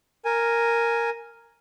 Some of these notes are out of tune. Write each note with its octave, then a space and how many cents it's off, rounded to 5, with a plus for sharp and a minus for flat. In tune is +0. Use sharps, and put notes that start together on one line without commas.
A#4 +0 G#5 +0